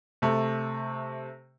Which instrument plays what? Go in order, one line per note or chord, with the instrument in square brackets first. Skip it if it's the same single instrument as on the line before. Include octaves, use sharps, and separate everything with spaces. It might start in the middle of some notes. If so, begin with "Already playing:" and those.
[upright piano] C3 A3